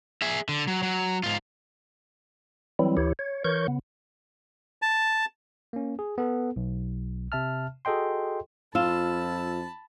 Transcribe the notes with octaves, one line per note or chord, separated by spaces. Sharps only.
G#4 E5
D3
F#3
F#3
G#2 F4
E3 F#3 G3 C4 E4
D2 E3 E4 G4 C#5
C#5
E3 A#4 C#5 C#6 G6
C#3 B3
A5
A#3 C#4
G#4
B3 A4
B1
C3 E5 A5 F6
F#4 G#4 A4 D#5 G5 C6
F2 F4 A5 B5 E6 E7